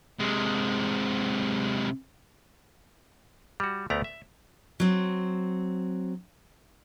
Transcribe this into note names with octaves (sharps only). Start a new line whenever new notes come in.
C3 G#3
G3 F#4
D2 A3 B3 D5 A#5
E5
F#3 C4